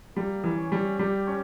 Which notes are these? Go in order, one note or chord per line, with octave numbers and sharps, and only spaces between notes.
G3 A#3
E3
C#4
G3
G3 G4
C#4